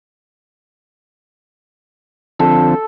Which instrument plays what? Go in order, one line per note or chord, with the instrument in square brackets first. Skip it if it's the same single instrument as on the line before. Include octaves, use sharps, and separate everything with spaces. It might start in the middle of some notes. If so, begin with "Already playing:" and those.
[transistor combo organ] D3 F3 C4 [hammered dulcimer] A4